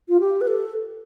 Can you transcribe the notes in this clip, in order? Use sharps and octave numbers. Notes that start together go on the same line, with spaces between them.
F4
G4
B4
A4